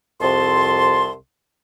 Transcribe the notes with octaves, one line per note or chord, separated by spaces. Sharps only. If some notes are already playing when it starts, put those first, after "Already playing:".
C2 F2 C3 A5 C6